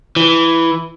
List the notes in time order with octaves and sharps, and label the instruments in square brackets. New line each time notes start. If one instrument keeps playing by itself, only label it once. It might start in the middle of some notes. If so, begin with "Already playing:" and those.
[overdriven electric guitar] E3